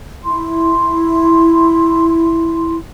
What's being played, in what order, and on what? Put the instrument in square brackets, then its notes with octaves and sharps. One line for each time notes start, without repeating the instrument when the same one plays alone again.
[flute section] E4 C6